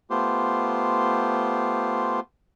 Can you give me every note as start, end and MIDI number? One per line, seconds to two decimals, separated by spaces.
0.10 2.20 57
0.10 2.20 59
0.10 2.20 65
0.10 2.20 67
0.10 2.20 72